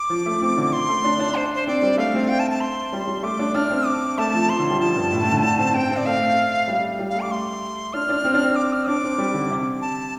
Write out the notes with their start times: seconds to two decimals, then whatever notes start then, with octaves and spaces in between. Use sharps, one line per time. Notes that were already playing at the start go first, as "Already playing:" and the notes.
Already playing: D6
0.10 F3
0.26 A3
0.42 C4
0.57 D3
0.73 C6
0.89 A3
1.04 D4
1.19 D4
1.36 C5
1.55 C5
1.67 C4 D5
1.82 G3
1.98 A3 F5
2.14 C4
2.29 G5
2.39 A5
2.51 A5
2.61 C6
2.93 G3
3.07 G3
3.23 A3 D6
3.39 D4
3.54 D4 F6
3.70 C4
3.86 D6
4.18 A3 A5
4.34 F3
4.49 F3 C6
4.59 D3
4.70 G3
4.80 F3 A5
4.95 G2
5.12 A2
5.23 A2
5.32 D3
5.43 D3
5.58 C4
5.74 C4 G5
5.90 C4
5.97 D5
6.06 A3 F5
6.68 G3
6.99 G3
7.10 A3 F5
7.21 D6
7.31 C6
7.93 D4 F6
8.09 D4
8.24 C4
8.34 D4
8.43 C4
8.56 D6
8.73 F6
8.87 D4 D6
9.04 C4
9.18 G3
9.34 D3
9.50 C3
9.82 A5